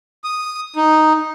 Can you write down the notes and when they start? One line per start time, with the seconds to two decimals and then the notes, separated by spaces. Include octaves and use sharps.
0.24 D#6
0.76 D#4